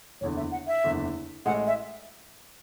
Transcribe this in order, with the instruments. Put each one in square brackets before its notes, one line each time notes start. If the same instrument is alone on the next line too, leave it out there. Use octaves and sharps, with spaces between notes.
[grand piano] F#1 E2 D3 [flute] C#5
[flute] E5
F#5
E5
[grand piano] F#1 E2 D3
[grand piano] A1 A2 G#3 [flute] F#5
[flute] E5